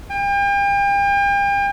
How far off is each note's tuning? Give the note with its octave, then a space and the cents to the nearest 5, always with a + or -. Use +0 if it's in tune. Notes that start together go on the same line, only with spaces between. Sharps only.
G5 +40